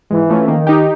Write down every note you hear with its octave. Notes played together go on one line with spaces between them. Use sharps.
G#2 E3
F3 A3 C#4
D#3 A#3
D#4 G4